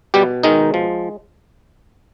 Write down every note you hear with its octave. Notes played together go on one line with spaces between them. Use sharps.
B2 G3 G4
D#3 G#3 D#4
F3